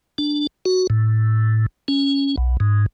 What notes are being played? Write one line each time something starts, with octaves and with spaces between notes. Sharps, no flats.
D4
F#4
A2
C#4
B1
G#2